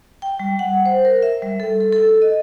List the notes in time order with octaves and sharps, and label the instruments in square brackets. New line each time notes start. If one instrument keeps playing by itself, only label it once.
[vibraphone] G5
G3
F#5
C5
A#4
E5
G3
A4
A4
A4
D#5